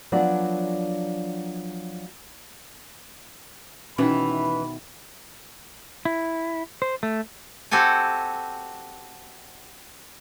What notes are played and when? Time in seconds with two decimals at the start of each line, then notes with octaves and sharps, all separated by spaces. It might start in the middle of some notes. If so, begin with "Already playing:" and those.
0.12 F3 F#3 B3 D4 D5
3.98 B2 D#3 E3 C#4 B5
6.05 E4
6.82 C5
7.03 A3
7.71 C4 F#4 G4 A4 G#5